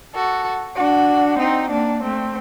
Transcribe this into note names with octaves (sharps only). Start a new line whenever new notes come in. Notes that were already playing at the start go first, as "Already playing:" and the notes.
F#4 A4
D4 F#4
C4 D#4
A#3 D4
A3 C4